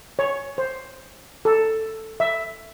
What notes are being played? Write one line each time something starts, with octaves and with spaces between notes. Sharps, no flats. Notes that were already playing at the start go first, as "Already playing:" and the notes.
C#5
C5
A4
E5